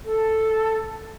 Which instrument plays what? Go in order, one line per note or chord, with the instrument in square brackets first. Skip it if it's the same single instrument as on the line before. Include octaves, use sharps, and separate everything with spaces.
[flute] A4